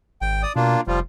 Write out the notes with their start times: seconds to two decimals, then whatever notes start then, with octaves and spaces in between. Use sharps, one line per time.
0.21 G#1 G5
0.42 D5 D#6
0.56 B2 A#3 D4 F4
0.87 F1 F3 G3 F4